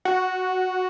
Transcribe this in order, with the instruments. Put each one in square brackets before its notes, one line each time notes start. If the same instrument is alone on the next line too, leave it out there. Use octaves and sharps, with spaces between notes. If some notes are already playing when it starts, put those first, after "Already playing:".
[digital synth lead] F#4